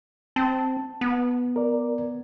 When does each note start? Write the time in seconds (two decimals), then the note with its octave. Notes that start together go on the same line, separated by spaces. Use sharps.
0.36 C4 A5
1.01 B3
1.56 A#4 D5